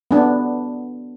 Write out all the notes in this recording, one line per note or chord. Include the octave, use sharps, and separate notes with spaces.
B3 D4